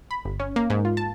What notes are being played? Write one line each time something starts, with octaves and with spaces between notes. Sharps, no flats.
B5
G1
C#4
A#3
G#2
F4
A5